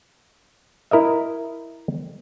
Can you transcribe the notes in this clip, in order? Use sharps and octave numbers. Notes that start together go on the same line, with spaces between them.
E4 A#4 D#5 E5